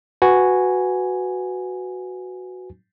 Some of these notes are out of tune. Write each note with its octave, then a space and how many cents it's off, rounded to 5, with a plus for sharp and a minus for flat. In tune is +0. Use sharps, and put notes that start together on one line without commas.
F#4 +0 B4 +10 G#5 +0